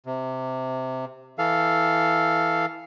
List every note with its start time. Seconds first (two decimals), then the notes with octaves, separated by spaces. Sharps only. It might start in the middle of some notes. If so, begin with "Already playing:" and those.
0.06 C3
1.38 E3 A4 F5